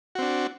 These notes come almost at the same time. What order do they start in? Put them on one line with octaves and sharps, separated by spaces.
F#4 C4 D4